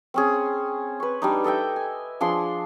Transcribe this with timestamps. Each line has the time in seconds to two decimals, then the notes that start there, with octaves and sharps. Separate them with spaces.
0.14 C4 C#4 G#4
1.00 B4 C#6
1.22 G3 D4 D#4
1.44 A4 D#5 E5 G5
1.76 G#5
2.21 F3 D4 G#4 C6